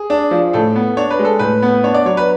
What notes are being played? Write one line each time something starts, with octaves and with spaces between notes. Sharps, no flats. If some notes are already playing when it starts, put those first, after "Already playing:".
Already playing: G#4
D4
F3
A2 A4
B3
D4 C#5
B4
G#3
A4
A2 B4
B3
D4 C#5
D5
F#3 C#5
B4